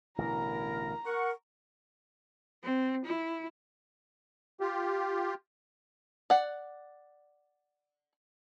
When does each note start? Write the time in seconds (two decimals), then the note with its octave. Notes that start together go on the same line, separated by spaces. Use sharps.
0.18 A1 B2 D3 E4 A#4 A#5
1.06 A#4 F#5 C#6
2.64 C4
3.06 E4
4.61 F4 G4
6.30 D5 F#5